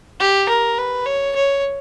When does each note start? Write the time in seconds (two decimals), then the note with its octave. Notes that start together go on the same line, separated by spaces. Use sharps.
0.20 G4
0.49 A#4
0.79 B4
1.06 C#5
1.36 C#5